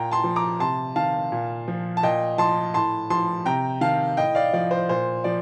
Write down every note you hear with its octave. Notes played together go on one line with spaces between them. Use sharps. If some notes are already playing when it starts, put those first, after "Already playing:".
Already playing: A#2 G5 A#5
A5 C6
F3
A#5 D6
C3 A5 C6
D#3 F5 A5
A#2
F3
A5
A#2 D#5 G5
F3 A5 C6
A2 A5 C6
F3 A5 C6
C3 G5 A#5
D#3 F5 A5
A2 D#5 G5
D5 F5
F3 D5
C5
A#2 C5
F3 D5